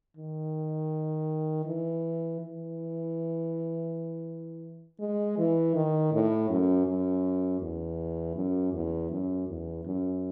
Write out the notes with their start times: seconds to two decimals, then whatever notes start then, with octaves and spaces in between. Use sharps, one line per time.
0.17 D#3
1.65 E3
2.41 E3
5.00 G#3
5.38 E3
5.75 D#3
6.13 A2
6.50 F#2
6.87 F#2
7.61 E2
8.36 F#2
8.73 E2
9.11 F#2
9.48 E2
9.86 F#2